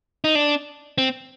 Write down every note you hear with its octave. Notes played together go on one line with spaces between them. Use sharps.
D#4
D4
C4